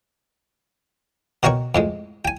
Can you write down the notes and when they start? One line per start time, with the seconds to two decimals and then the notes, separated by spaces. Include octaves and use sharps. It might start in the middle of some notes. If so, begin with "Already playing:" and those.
1.43 B2 F#4 A#4 C#5 G5 C#6
1.75 F2 A2 G#3
2.25 G5 G#5